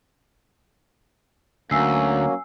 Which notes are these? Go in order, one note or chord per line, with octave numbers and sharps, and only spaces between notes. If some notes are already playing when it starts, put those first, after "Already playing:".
D2 F#3 A#3 C#4 G#5 E6 C7